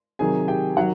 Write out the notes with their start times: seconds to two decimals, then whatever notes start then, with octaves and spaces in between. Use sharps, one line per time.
0.19 C3 D#3 F#3 G#4 G#5
0.48 G4 G5
0.77 D#3 F#3 F#4 F#5